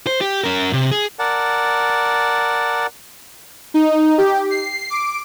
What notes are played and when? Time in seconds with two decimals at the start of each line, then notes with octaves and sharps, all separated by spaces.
0.07 C5
0.21 G4
0.44 C#4 A#4
0.73 C3
0.91 G#4
1.19 A#4 D5 F#5 A5
3.74 D#4
4.18 G4
4.51 C7
4.90 D6